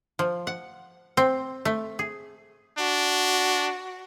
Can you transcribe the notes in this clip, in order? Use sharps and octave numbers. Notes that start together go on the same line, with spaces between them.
F3
F#5
C4
A3
G#4
D4 F#4